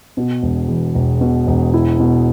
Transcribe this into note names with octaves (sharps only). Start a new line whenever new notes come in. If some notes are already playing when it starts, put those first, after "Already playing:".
B2
E1
E2
E1
B2
E1
E4
B2